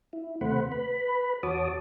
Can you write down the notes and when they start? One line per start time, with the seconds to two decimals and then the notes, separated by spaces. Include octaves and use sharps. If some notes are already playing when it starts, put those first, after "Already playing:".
0.13 E4
0.41 D#2 C3 A3 C5 F#5 B5
0.72 B4 B5
1.43 E2 F#4 C#5 A5 D6 D#6